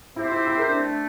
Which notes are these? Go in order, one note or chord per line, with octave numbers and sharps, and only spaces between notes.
C4 E4 G4 C5 E5
E4
E4
A#4
D4
A3